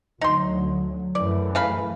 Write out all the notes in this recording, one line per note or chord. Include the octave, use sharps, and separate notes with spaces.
D2 F#3 D#4 C6
F#2 E3 A3 D5
C#3 F5 B5